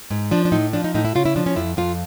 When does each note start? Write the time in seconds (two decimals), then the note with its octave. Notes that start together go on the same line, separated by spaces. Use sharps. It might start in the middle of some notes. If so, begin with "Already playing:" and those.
0.11 G#2
0.31 F3 D4
0.45 D4
0.52 A2 D#4
0.73 F3 D4
0.84 D#4
0.94 A2 D#4
1.05 E4
1.15 C#3 F4
1.26 E4
1.36 F3 D4
1.46 C#4
1.56 F2 E4
1.77 F2 F4